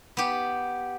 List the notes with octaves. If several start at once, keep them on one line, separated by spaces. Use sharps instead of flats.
B3 G4